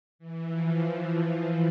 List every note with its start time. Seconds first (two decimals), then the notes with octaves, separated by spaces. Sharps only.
0.19 E3
0.48 F3
0.78 E3